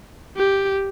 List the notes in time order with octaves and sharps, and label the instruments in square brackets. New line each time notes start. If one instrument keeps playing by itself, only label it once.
[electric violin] G4